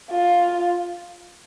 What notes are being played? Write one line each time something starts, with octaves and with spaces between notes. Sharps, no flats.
F4